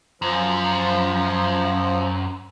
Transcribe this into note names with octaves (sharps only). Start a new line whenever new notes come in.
F#2 F3